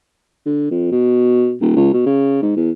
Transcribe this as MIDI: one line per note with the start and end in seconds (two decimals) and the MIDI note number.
0.46 0.69 50
0.71 0.88 41
0.91 1.55 47
1.61 1.73 27
1.76 1.91 37
1.93 2.02 47
2.06 2.38 49
2.42 2.52 44
2.56 2.71 40